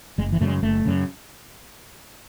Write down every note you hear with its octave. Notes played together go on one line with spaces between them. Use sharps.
F#1 G#3
E3
F#2 C#3 A3
G#3
F#1 A3
F#2 C#3